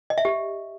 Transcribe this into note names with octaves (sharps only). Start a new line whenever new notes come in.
D#5
E5
G4